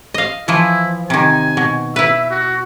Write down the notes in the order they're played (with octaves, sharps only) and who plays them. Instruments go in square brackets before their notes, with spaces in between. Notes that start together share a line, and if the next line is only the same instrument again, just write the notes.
[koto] D#5 F5
[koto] E3 F3 [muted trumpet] E4
[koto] C3 D#3 [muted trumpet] G#5
[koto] B2
[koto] E4 B4 [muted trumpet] E5
[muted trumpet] F#4